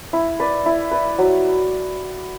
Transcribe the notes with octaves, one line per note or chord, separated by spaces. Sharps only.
E4
B4 D5
E4
B4 D5
F#3